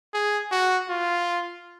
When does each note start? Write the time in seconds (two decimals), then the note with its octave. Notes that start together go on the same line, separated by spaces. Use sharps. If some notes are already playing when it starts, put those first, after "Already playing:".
0.14 G#4
0.51 F#4
0.89 F4